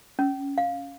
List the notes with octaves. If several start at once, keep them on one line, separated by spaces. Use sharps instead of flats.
C#4
F5